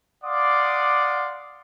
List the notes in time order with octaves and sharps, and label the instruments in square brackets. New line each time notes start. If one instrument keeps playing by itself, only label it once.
[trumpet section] D5 F5 F#5 C6 D6 D#6